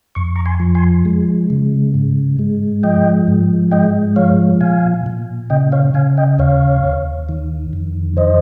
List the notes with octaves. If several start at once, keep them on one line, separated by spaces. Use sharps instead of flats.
F2 C#6
A#5 C#6
G#5 C6
F3
G#5 C6
G#3
C#3
G#2
G#3
F3 D#5 G5
G#2
G#3 D#5 G5
F3 C#5 F5
A#2 F5 G#5
A#2
C#3 D#5 G5
C#5 F5
C#3 F5 G#5
D#5 G5
D#2 C#5 F5
D#2
D#3
F2
D#3 C5 D#5